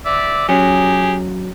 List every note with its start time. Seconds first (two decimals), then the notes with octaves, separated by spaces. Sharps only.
0.06 D5 E5
0.49 F#3 C#4 G4 G#4